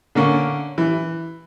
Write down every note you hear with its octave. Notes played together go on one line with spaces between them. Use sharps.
D3 A#3 C#4
E3